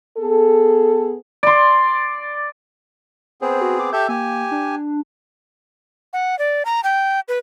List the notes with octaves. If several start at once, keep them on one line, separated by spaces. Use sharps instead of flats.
B3 G#4 A4
D5 C6
B3 C4 G#4 C5
F#4
D6
G4 A4 E5 G6
A#3 G4 G#5
D4
F#5
D5
A#5
G5
B4